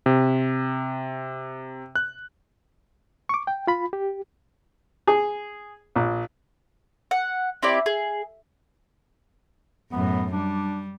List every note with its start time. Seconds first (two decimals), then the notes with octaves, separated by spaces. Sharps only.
0.06 C3
1.95 F#6
3.29 C#6 D6
3.47 G5
3.67 F4 B5
3.93 G4
5.07 G#4
5.96 A#1
7.11 F#5
7.62 C4 E4 G4 D5
7.86 G#4
9.92 F#2 A2 B3
10.33 G3 D4